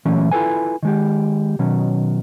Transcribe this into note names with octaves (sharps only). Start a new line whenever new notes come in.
A#2 E3 F#3 A3 C#4
E4 F4 A4 B4 G#5
D#3 G#3 G4
B2 D#3 F#3 C#4